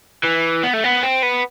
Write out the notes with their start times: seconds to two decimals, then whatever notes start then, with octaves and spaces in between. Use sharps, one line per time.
0.23 E3
0.63 B3
0.74 A3
0.84 B3
1.03 C4
1.22 B3